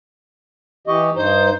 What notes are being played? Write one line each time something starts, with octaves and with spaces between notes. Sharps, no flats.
E3 G4 D#5 C#6
G2 D#4 C5